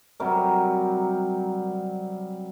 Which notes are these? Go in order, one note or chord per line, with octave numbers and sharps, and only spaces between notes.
C3 F#3 G3 A#4